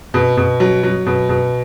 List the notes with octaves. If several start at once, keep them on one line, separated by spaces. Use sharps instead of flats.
B2
B2
F#3
F#3
B2
B2